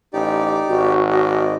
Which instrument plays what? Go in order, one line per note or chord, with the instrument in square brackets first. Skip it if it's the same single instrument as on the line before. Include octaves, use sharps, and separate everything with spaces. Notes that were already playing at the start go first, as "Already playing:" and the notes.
[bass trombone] A1 [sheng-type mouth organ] D#4 G4 D5
[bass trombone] G#1 [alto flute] F#4
[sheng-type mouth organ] D5 D#5